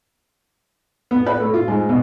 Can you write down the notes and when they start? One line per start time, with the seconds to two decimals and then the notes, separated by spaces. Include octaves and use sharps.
1.11 B3
1.26 B4
1.40 A3
1.54 F4
1.68 G#2
1.89 B2